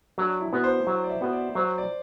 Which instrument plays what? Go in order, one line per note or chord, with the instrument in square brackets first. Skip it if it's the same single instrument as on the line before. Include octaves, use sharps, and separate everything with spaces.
[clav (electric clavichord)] F#3 [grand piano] D4
[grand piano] E4
[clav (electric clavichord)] B3 F#4 B4
[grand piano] C5
[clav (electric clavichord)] F#3
[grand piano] D5
E5
[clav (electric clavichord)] B3 F#4 B4
[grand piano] D5
[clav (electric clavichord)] F#3 [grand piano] C5
[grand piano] D5